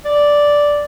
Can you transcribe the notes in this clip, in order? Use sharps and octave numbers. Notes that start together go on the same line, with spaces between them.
D5